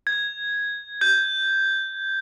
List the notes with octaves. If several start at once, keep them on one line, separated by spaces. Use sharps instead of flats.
G#6
G6